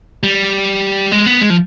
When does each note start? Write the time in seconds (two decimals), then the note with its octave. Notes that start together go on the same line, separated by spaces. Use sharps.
0.23 G3
1.12 G#3
1.26 B3
1.41 G#3
1.50 F3